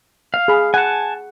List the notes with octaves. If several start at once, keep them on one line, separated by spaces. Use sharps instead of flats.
F5
G#4 B5
F#5 G#5 A5